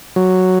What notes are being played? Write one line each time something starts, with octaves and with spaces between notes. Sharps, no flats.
F#3